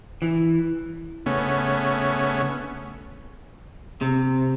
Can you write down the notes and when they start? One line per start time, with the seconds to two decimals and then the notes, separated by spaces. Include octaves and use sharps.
0.22 E3
1.26 C#3 A3 B3 C#4
4.01 C3